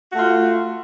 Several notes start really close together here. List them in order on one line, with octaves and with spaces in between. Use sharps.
F#4 A3 F4